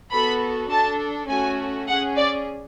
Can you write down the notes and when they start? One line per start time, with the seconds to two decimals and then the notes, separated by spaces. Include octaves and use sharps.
0.12 B3 F#4 A4 B5
0.70 D4 A4 A5
1.29 A3 C#4 F#4 G#5
1.87 G#4 F#5
1.92 C#4
2.17 D5